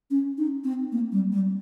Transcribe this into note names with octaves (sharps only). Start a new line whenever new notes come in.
C#4
D#4
C4
A#3
G3
G3